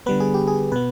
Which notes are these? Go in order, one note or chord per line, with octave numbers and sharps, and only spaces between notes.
D3 G3 B3 B4
G#4
G4
G#4
B2 B3 B4